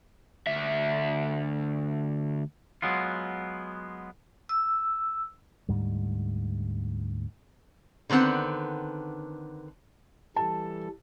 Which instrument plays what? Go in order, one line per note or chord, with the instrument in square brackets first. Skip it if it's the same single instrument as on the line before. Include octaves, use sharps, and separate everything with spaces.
[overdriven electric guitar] D2 E5
[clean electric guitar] F#3 G#3 B3 F4
[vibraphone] E6
[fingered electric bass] D2 G#2 G3
[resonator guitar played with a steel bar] D3 D#3 B3 C4 F#5
[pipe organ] E3 G3 A4 [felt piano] A5